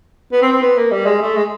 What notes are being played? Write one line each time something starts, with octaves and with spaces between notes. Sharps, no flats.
B3
C4
C4
B3
A#3
G3
G#3
A3
G#3